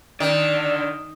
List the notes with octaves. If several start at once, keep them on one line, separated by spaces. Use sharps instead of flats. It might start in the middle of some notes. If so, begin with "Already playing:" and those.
D3 D#3 D5